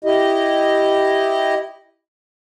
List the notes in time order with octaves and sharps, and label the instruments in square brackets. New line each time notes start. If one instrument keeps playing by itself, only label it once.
[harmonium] E4 G4 D#5